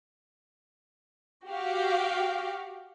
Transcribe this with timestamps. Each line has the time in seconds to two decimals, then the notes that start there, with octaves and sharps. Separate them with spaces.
1.46 F#4 G4 F5 G5